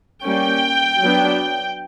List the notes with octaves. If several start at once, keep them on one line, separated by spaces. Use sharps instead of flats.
G3 A#3 C#4 G5
F#3 B3 D4